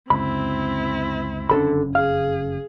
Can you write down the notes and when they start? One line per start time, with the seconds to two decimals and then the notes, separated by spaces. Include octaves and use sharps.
0.10 C#2 F#2 D3 C4 E4 B5
1.50 F#1 F2 D3 C#4 A4 B5
1.95 G#4 F5